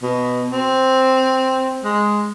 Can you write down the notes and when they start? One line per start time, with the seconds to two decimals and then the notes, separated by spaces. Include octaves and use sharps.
0.03 B2
0.50 C4
1.84 G#3